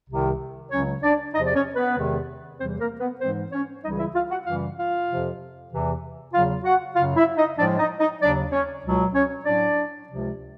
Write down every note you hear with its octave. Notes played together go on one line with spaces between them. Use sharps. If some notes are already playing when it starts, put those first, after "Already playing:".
C2 C3 D#3
C#2 C#3 F#3 C#4 C#5
D4 D5
E2 C3 F3 D#4 D#5
D5
C#4 C#5
B3 B4
E2 C3 D#3 G#3
E2 C3 E3 G3 C4 C5
A#3 A#4
B3 B4
G#2 E3 G#3 C4 C5
C#4 C#5
C#2 C#3 E3 G3 D#4 D#5
E4 E5
F4 F5
F#4 F#5
F#2 C#3 E3 G3 F4 F5
F4 F5
F2 C3 F3
E2 C3 E3
E2 C#3 F#3 F4 F5
F#4 F#5
F#2 C#3 F#3 F4 F5
E4 E5
D#4 D#5
A2 F3 G#3 D4 D5
D#4 D#5
D#4 D#5
D#2 C#3 F#3 D4 D5
C#4 C#5
C#2 B2 F#3
C#4 C#5
A2 F#3 D4 D5
C#2 C3 F3